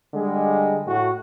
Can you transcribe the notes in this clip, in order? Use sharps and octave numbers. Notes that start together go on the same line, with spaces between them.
D3 G3 G#3
A2 F#4